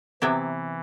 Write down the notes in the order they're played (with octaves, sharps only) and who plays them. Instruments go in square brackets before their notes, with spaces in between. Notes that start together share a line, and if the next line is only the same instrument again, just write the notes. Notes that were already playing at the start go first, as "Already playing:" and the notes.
[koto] C3 F#3 B3 E4 G4 [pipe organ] E3